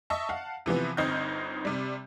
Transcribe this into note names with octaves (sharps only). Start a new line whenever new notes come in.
D#5 E5 A5 C#6
F5 F#5 A5
C3 E3 F3 B3
G1 C4 D#4 D#5 F6 G6
C3 G3